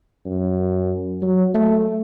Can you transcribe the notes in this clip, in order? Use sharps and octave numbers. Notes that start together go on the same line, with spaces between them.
F#2
F#3
A3